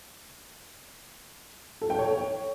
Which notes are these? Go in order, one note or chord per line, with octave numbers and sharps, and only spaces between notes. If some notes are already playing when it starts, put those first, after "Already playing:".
A4
G5
C#5